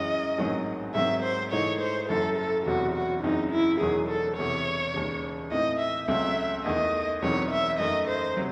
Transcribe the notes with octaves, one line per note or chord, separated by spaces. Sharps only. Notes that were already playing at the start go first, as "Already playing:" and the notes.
Already playing: F#2 E3 G#3 C#4 D#5
A1 G#2 D#3 F#3 C4
G#2 D#3 F#3 C4 E5
C5
G#2 E3 A3 D#4 C#5
C5
F#1 F#2 E3 A4
A4
E1 E2 C3 F#3 F#4
F#4
F#1 F#2 C#3 E3 C4 D#4
E4
E1 E2 D#3 F#3 G#4
A4
E1 E2 C3 C#5
E1 D#2 C#3
A2 E3 C4 D#4 D#5
E5
C#2 C#3 F#3 A3 C4 E5
E2 D#3 A3 D#4 D#5
E1 E2 D#3 F#3 C4 C#5
E5
F#2 D#3 A3 D#5
C5
C3 F#3